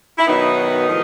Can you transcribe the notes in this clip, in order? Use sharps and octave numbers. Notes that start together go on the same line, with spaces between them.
E4
B2 D#3 F#3 B3 D#4
A2 F3